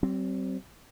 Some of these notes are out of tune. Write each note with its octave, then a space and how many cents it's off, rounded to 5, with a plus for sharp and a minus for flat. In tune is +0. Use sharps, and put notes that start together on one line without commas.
G3 -45 C4 +0